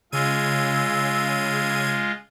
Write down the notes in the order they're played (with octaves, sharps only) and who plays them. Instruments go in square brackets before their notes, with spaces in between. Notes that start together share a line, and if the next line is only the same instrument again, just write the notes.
[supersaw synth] C#3 G#6 D#7 [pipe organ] G#3 F4 [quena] E6